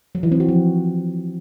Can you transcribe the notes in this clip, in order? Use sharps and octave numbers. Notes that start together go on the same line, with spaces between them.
F#3
E3
C4
F#4
F3